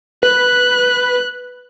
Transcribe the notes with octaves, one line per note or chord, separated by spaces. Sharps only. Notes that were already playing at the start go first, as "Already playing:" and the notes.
B4 F#6